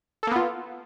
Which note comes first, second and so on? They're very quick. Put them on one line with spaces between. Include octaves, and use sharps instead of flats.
A4 A#3 B3 F4